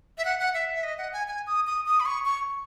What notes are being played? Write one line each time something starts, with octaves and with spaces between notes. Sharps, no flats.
E5
F#5
F#5
E5
E5
D#5
F#5
G#5
G#5
D#6
D#6
D#6
B5
C#6
C#6